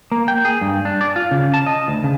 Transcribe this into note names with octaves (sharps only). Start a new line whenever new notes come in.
A#3
G5
G#4
G2
D4
D5
F4
C#3
A5
D#5
D2
C#3